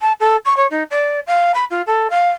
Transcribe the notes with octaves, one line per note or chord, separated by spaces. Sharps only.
A5
A4
C#6
C#5
D#4
D5
F5
B5
F4
A4
F5